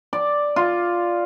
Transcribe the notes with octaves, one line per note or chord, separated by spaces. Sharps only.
D5
F4